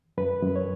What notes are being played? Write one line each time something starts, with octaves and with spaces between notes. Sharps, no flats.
F#2 B4
F#2
C#5